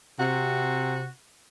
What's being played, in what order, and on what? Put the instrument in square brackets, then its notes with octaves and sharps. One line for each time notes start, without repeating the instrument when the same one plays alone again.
[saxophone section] C3 [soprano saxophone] F#4